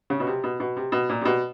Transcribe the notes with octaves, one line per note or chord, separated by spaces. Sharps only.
C#3
B2
C3
B2
B2
C3
B2
A#2
C3
B2